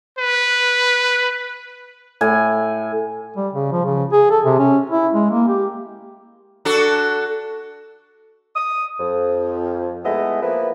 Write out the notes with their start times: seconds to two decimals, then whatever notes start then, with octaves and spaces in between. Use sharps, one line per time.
0.18 B4
2.21 A2 G#5
3.36 G3
3.53 C#3
3.72 F3
3.85 C#3
4.12 G#4
4.30 A4
4.45 C3
4.59 C#4
4.90 E4
5.14 G#3
5.31 A#3
5.48 G4
6.65 D4 F#4 A4
8.56 D#6
9.00 F2
10.05 G#3 A3 B3 E4 D#5
10.42 F3 A#3 E4 B4